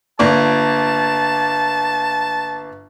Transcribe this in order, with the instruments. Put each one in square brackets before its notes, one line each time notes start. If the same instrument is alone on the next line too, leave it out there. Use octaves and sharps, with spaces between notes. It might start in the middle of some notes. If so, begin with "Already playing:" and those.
[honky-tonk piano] G1 A#3 D5 [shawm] A5